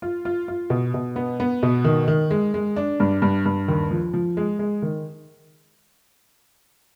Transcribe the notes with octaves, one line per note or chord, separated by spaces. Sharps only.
F4
F4
F4
B2
B2
B3
B3
B2
D#3
D#3
G#3
G#3
D4
G2
G2
G2
D#2
F3
F3
G#3
G#3
D#3